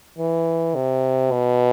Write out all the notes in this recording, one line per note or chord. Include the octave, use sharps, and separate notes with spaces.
E3
C3
B2